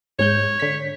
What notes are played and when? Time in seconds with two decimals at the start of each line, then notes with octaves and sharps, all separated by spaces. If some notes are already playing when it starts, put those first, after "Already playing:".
0.19 G#2 G#3 C#5 G6
0.59 D3 B6